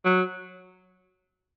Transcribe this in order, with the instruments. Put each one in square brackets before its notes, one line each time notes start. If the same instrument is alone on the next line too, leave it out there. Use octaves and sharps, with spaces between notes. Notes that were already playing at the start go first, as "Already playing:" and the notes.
[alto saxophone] F#3